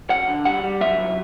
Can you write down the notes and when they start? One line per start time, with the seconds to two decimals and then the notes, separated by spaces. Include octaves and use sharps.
0.10 F#2 F#5
0.28 D3
0.45 G3 F#5
0.63 G3
0.81 F#3 E5
0.98 C2